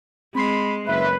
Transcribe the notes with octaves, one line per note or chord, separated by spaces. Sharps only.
G#3 C4 B5 C6 C7
F#1 B4 E5